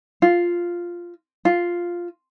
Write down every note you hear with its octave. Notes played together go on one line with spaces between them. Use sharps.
F4
F4